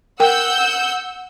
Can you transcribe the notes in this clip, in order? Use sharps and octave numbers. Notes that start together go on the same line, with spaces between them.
A#4 F#5 G5 E6 G6